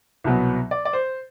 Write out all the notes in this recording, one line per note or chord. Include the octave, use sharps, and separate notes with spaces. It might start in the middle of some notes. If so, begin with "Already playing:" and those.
C2 B2 F#3 B3
D5
D5
C5